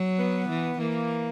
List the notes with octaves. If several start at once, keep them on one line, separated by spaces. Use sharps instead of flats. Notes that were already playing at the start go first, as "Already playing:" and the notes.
Already playing: F#3
B3
E3
E3 A#3